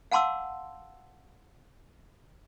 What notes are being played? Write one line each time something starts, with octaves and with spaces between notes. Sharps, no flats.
F5 F#5 A5 C6 D6 E6